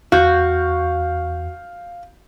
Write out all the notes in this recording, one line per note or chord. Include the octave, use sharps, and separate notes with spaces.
E2 F#4 F5 G6